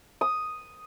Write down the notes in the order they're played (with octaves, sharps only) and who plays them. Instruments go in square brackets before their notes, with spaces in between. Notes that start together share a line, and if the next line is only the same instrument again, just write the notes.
[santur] D#6